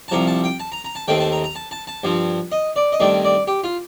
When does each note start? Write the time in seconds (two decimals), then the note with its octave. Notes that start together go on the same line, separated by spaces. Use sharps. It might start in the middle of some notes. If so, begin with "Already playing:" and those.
0.08 A5
0.11 C2 C3 F3 A#5
0.27 A5
0.44 G5
0.60 A5
0.72 A#5
0.85 A#5
0.95 A5
1.08 D#2 D#3 A3 C4 G5
1.20 A5
1.32 A#5
1.44 A#5
1.55 A5
1.71 A5
1.87 A5
2.03 G2 F3 C4
2.52 D#5
2.76 D5
2.92 D#5
3.00 G2 D#3 A3 C4 D5
3.24 D5
3.47 G4
3.64 F4